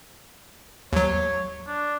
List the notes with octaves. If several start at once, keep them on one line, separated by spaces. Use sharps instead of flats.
D#2 F#3 C#5
D4